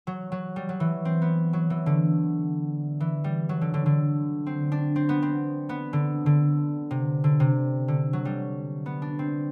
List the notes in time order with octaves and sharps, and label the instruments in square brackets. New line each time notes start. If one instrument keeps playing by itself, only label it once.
[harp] F#3
F#3
G3
F#3
E3
C4
B3
F#3
E3
D3
E3
G3
F#3
D3
D3
D3
C4
D4
C4
B3
C4
B3
D3
D3
C3
D3
C3
D3
F#3
G3
B3
D4
C4